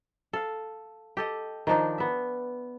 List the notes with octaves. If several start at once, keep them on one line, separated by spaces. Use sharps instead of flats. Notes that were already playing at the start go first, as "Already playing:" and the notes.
A4 F5
G4 A4 D#5
D#3 F3 D4 D#4
B3 E5